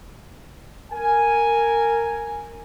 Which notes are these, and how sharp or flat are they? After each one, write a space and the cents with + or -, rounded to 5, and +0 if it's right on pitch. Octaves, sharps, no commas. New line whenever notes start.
A#4 -10 G#5 +0